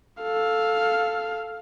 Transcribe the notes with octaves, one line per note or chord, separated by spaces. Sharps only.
A4 F5